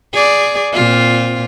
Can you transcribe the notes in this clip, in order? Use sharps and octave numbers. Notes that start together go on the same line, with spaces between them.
G#4 D5
A#2 C4 F4